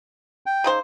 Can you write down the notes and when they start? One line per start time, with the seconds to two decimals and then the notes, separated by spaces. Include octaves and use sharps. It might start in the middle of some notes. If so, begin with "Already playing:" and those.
0.46 G5
0.64 C#3 D#4 C5